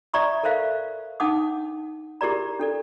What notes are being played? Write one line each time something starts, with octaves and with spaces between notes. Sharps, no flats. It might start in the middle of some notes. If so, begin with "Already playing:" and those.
D5 E5 A#5 C#6 D#6
A4 A#4 C5 E5 F5
D4 D#4 F#5 A5 D6 D#6
E4 G4 G#4 A#4 D5 A#5
D4 A4 D5